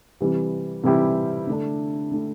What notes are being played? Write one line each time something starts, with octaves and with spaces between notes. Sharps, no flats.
C3 E3 G3 E4 G4
C3 E3 G3 E4 G4
D3 A3 D4
D3 A3 D4